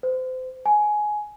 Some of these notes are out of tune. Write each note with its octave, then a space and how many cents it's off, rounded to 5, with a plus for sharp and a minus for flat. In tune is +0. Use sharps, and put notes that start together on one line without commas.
C5 -30
G#5 +15